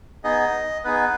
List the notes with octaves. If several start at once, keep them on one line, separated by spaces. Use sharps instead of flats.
B3 D#4 G#4 D#5
B3 D#4 G#4 B4